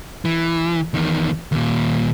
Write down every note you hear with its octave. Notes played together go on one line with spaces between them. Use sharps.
E3
E2 D#3
D#2 A#2